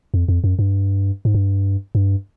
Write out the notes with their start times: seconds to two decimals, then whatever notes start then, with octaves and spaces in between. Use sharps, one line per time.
0.14 F2
0.28 F2
0.44 F#2
0.59 G2
1.25 G#2
1.34 G2
1.95 G2